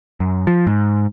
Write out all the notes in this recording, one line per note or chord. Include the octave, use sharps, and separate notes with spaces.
F#2
F3
G#2